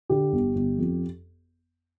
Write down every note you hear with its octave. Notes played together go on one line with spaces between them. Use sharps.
D3 G4
G1
G1
F2